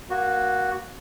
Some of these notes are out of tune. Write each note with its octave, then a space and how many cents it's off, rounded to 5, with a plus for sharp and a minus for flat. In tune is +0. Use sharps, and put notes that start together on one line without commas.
A#3 +20 F#4 +0